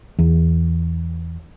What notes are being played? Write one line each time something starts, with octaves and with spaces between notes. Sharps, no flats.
E2